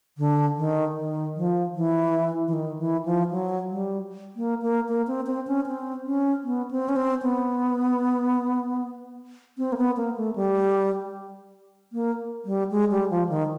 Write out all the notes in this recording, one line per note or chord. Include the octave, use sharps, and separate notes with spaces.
D3
D#3
D#3
F3
E3
E3
D#3
E3
F3
F#3
G3
A#3
A#3
A#3
C4
C4
C#4
C4
C#4
B3
C4
C#4
C4
B3
C4
A#3
B3
A#3
A3
G3
A#3
G3
G#3
G3
F3
D#3